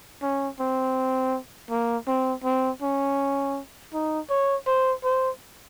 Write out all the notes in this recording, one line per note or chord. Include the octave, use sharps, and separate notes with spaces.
C#4
C4
A#3
C4
C4
C#4
D#4
C#5
C5
C5